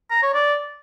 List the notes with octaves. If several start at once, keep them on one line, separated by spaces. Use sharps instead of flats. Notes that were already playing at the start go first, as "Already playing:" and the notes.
A#5
C#5
D5